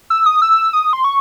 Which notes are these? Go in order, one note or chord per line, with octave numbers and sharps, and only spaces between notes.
E6
D#6
E6
D#6
C6
C#6